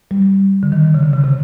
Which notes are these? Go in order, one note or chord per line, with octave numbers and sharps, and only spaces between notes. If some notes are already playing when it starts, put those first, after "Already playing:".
G3
D3
D#3
C#3
D3
C#3
C3